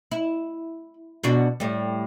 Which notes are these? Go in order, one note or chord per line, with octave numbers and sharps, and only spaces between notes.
E4
B2 D4 F#4
A2 G3